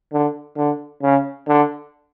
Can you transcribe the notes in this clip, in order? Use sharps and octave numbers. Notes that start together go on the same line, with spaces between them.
D3
D3
C#3
D3